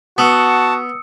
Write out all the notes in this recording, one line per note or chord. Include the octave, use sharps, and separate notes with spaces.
B3 F#4 A5 D#6 E6 C#7